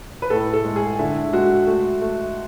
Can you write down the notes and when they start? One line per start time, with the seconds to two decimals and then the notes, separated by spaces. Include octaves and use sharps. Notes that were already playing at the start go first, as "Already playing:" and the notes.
0.22 B4
0.30 A2 A4
0.54 A4
0.64 G#3
0.76 G#4
0.99 D3 E4
1.33 G#3 F#4
1.67 A3
2.02 A3